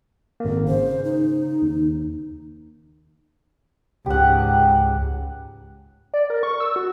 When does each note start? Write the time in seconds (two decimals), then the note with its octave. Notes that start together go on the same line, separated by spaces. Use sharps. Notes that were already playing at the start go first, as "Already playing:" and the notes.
0.40 G#1 A#3
0.67 C#3 C5
1.04 D#4
1.62 D#2
4.06 C#2 G#2 G4 F#5
6.14 D5
6.30 A#4
6.43 C#6
6.60 E6
6.76 F#4